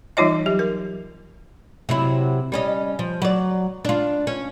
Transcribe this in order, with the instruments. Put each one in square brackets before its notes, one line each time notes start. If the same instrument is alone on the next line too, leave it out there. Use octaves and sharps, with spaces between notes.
[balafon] E3 G3 D#4 F4 C#5 D#5
F#3 G4
A#4
[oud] C3 F#3 E4
G3 C#4 D#5
F3
F#3 D5
D4 F4
C#4